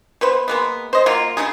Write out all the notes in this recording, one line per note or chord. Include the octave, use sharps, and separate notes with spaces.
B2 B4 C5
G#3 A#3 B3
C5 D#5
F#3 A#3 F4
C#3 F3 D#4 G#4